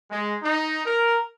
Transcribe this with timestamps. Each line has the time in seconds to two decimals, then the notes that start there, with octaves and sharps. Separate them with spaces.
0.10 G#3
0.43 D#4
0.85 A#4